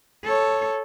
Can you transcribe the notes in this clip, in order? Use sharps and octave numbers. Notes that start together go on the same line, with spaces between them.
A4 C#5